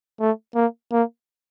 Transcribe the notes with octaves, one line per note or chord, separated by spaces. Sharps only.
A3
A#3
A#3